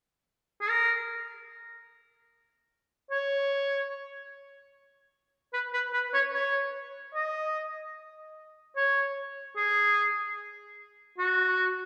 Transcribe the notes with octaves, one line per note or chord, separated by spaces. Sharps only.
G#4
A#4
C#5
B4
B4
B4
C#5
C#5
D#5
C#5
G#4
F#4